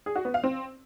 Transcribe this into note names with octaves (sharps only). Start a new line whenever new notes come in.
G#4
F#4
B3
F5
C4